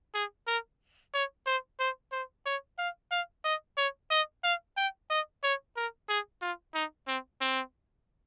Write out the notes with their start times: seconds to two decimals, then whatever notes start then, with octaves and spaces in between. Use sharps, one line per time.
0.14 G#4
0.47 A#4
1.14 C#5
1.46 C5
1.79 C5
2.12 C5
2.46 C#5
2.78 F5
3.11 F5
3.44 D#5
3.77 C#5
4.11 D#5
4.44 F5
4.77 G5
5.10 D#5
5.43 C#5
5.76 A#4
6.09 G#4
6.42 F4
6.74 D#4
7.07 C4
7.41 C4